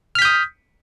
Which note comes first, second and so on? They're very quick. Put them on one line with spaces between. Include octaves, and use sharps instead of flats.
F6 B6 G6 D#6